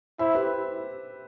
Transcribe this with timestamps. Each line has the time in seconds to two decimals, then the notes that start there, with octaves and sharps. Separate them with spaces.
0.19 E4 C5 E5
0.35 G4 B4